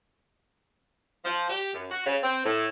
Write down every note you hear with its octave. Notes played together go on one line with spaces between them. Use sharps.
F3
G4
F#2
F#4
C#3
C4
A2